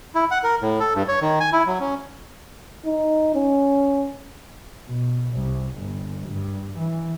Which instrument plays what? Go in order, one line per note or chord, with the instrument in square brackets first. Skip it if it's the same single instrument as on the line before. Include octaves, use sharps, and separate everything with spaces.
[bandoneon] E4
F#5
A#4
A2
A4
G2
C#5
D#3
G#5
E4
F#3
C#4
[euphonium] D#4
C#4
[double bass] B2
C2
G1
G2
E3